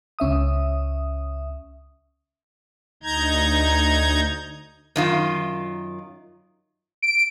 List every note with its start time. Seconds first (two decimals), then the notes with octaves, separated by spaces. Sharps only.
0.19 C#2 C#4 E5 D#6
3.03 D2 D#4 A#5 G6 G#6
4.96 F#2 D#3 F4
7.02 D7